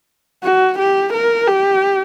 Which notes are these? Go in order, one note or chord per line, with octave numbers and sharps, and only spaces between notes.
F#4
G4
A#4
G4